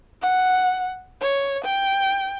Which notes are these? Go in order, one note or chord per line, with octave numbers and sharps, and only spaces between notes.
F#5
C#5
G5